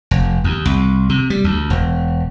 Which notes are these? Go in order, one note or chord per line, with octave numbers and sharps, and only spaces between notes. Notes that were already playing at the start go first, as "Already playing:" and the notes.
F1
D#2
C2
C3
G3
D2
E1